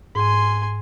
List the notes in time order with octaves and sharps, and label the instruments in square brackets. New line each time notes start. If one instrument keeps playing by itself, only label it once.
[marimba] G#2 [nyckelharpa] G#5 C6